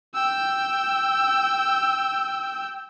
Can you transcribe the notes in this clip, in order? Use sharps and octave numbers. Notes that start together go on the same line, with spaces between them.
G5 E6